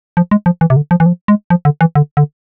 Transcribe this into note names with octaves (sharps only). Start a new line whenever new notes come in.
F3
G#3
F3
E3
C3
D3
F3
E3
F3
G#3
F3
D3
E3
D3
D3